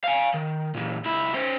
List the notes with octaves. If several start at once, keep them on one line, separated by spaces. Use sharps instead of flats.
F5 G#5
D#3
A#2 E3
C#2 E4
C#4 C5